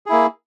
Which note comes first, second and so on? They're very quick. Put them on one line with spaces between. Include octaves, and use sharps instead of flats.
G#4 E4 A#3